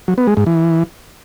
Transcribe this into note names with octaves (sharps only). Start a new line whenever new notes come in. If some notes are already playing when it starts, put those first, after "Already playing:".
F#3
B3
G#3
G#2
E3